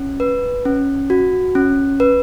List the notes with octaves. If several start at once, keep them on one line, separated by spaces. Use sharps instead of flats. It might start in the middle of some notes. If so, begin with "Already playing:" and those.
Already playing: C#4
B4
C#4
F#4
C#4
B4